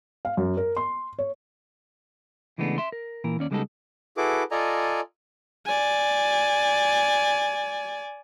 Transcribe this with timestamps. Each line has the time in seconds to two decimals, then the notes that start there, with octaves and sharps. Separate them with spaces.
0.25 F5
0.37 F#2
0.57 A#4
0.77 C6
1.19 C#5
2.58 C#3 E3 G#3 A3 B3 D4
2.78 E5 C6
2.92 A#4
3.24 A#2 E3 A#4
3.39 D#2 C#4 D5
3.51 C#3 G3 G#3 B3 D#4 A4
4.17 E4 F#4 G#4 A4 B4 D6
4.51 F4 A4 D5 D#5 G#5 A#5
5.66 D5 G#5